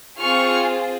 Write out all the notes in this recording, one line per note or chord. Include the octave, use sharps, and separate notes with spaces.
C4 F4 G#4 C#6 F6